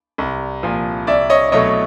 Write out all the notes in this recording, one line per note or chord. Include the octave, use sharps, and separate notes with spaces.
C2
A#2 F3
C2 D5 E5
C#5 D#5
B2 F#3 A3 C#5 D#5